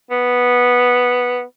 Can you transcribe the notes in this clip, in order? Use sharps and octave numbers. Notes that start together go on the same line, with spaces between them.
B3